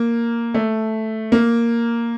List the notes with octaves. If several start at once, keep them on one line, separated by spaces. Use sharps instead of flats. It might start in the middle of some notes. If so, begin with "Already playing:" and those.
Already playing: A#3
A3
A#3